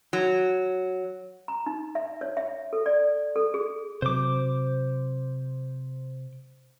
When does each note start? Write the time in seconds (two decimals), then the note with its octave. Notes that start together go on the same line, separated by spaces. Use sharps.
0.13 F#3
1.48 A#5
1.66 D#4
1.95 E5
2.21 C#5
2.37 E5
2.73 A4
2.86 D5
3.36 A4
3.54 G#4
4.02 C3 F#3 C5 D6